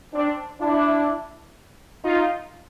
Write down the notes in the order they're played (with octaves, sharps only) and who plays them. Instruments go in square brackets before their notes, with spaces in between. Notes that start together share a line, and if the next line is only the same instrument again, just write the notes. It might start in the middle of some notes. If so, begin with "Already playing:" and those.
[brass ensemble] C4 D4
D4 E4
D#4 F4